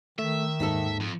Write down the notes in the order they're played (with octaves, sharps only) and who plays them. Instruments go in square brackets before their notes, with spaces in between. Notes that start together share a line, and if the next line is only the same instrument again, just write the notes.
[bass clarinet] D#3 [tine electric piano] A3 [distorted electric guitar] E5
[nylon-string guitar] D#2 D#4 A4 [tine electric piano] G#2
[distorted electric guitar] F2